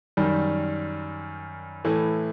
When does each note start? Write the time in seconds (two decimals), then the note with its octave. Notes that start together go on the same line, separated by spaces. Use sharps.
0.17 F#2 D#3 G3
1.85 A2 E3 A3